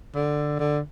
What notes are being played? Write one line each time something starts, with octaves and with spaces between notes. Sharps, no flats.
D3
D3